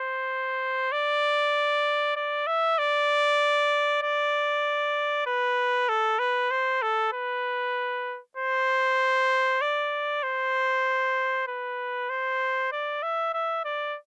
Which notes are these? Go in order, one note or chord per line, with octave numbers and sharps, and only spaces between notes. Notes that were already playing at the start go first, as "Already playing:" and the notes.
Already playing: C5
D5
D5
E5
D5
D5
B4
A4
B4
C5
A4
B4
C5
D5
C5
B4
C5
D5
E5
E5
D5